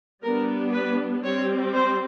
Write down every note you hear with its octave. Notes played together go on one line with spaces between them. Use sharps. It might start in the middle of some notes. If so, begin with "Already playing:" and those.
G3 B3 D4 A#4
B4
G3 C4 C#5
C5